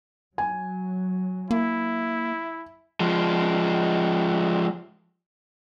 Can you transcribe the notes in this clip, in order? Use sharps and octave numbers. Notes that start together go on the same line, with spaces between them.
F#3 G#5
A#3 E4
F3 G#3